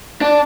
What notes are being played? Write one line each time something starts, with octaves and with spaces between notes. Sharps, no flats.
D4